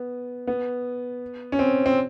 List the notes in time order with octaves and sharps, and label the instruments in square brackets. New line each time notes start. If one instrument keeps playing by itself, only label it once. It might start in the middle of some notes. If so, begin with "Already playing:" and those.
Already playing: [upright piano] B3
B3
C#4
C4
C4